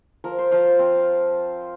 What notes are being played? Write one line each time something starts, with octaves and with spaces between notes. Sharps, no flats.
F3 A#4
C5
F3 F5
C4